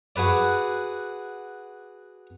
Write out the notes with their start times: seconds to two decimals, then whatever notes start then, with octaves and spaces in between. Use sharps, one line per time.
0.16 F#4 G#4 B4 D5